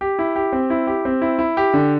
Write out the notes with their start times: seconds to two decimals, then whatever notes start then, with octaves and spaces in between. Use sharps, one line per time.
0.01 G4
0.19 E4
0.36 G4
0.53 C4
0.70 E4
0.87 G4
1.05 C4
1.22 E4
1.39 E4
1.57 G4
1.74 D3